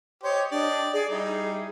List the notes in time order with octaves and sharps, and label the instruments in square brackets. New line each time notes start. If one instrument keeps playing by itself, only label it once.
[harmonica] G4 C5 D#5 [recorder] C#5
[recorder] D4 [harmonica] G4 D5 D#5
[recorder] G#4 [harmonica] D5
[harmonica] G3 D#4 E4 [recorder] G#4